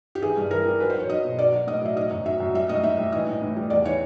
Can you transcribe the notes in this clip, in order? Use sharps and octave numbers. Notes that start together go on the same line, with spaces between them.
G4
E3 G#4
G2
E3 A#4
G3
F#3 B4
C5
F#3
C#5
F#3 D#5
B2
F#3 D5
F#3
A2 D#5
F#3 E5
F#3 D#5
F#2
F#3 E5
F#2
G3 E5
A2 D#5
A2 E5
G3
E3 D#5
A2
A2
G3
E2 D5
E3 C#5